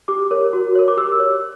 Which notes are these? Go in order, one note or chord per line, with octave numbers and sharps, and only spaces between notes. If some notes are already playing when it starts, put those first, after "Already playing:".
G4 D6
A#4 C#5
F#4
A#4 C#5
D6
G4 E6
C#5